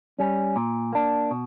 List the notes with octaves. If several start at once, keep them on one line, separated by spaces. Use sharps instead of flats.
G3 C#4
A#2
A#3 D4
B2